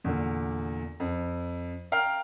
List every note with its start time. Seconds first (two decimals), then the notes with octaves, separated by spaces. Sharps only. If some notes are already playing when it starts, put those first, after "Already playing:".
0.04 E2 A#2 D3
1.00 F2
1.92 A#4 F5 G5 A#5 F6